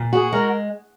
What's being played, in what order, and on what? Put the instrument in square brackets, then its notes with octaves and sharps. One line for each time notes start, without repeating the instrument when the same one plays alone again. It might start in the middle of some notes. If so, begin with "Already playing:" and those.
Already playing: [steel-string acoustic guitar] A#2
[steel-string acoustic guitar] F#4 [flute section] G#4
[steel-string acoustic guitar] G#3 [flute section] A#4